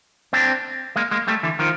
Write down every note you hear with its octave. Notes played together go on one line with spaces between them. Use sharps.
C4 D4
G#3 A#3
G#3 A#3
G3 A3
D3 E3
D#3 F3